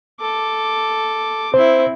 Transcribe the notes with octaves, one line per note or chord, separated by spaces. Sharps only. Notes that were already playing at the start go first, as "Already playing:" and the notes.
A4 D6
C4 E4 C5